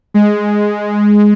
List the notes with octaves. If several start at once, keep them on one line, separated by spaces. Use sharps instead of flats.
G#3